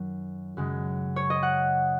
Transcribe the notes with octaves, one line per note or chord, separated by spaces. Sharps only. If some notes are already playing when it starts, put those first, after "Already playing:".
Already playing: F#2 D#3 F#3
F#2 C#3 G#3
C#5
D#5
F#5